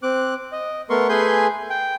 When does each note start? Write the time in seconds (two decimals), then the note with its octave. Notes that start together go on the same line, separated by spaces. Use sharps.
0.03 C4 D6 F#6
0.52 D#5
0.90 A3 B3 A#4 C6 C#6
1.09 A3 G#4 B4 G#5 C6 G6
1.70 G5